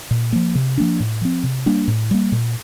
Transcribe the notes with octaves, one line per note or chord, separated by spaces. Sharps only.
A#2
F3 A#3
C3
F3 A#3 D4
A2
F3 C4
C3
G3 A#3 D4
A2
G3 A#3
A#2